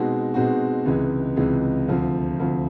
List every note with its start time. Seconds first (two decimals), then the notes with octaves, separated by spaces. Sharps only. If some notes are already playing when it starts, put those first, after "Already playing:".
Already playing: B2 G#3 C4 D#4 F#4
0.34 B2 G#3 C4 D#4 F#4
0.85 C#2 C3 E3 G#3
1.37 C#2 C3 E3 G#3
1.88 D2 C3 F3
2.40 D2 C3 F3